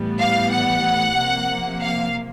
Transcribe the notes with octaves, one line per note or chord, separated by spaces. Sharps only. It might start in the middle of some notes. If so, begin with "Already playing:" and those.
Already playing: A2 E3 G3 B3
F5
F#5
C3 F3 A#3
F5